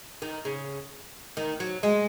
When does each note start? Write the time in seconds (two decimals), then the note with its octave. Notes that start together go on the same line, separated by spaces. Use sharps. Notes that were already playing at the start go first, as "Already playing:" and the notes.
0.22 D#3
0.45 C#3
1.37 D#3
1.60 F#3
1.83 G#3